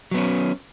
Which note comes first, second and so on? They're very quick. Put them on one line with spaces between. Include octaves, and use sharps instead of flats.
F#3 B3 C#4